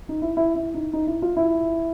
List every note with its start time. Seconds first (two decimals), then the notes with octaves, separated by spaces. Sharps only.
0.09 D#4
0.22 E4
0.37 E4
0.56 E4
0.74 D#4
0.93 D#4
1.07 E4
1.22 F4
1.37 E4